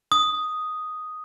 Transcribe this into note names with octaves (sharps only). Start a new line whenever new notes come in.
D#6